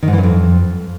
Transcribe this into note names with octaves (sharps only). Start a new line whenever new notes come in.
D#3
G#2
E3
F#2
F2